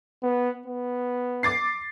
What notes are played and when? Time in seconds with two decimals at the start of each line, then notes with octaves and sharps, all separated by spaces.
0.23 B3
0.66 B3
1.43 D6 A6 C7